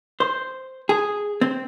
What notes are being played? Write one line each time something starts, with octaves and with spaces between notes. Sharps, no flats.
C5
G#4
C4